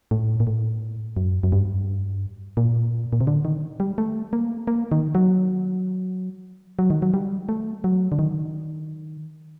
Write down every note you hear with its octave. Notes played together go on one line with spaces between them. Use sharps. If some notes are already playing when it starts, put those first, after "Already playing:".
A2
A#2
A2
F#2
F#2
G2
A#2
A#2
C3
D3
D#3
G3
A3
A#3
A#3
D#3
F#3
F#3
D#3
F#3
G3
A3
F#3
D3
D#3